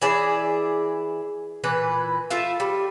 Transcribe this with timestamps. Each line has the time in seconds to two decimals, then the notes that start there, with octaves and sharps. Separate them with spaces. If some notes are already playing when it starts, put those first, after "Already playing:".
0.02 E3 G#4 D5 E5
1.64 A#2 E3 B4
2.30 A3 F4 E5
2.60 G3